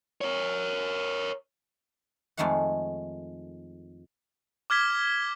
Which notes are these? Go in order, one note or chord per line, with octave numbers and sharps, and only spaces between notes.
A#4 C#5
F2 D#3 G#3 A3 F5 F#5
D6 F6 G#6 B6 G7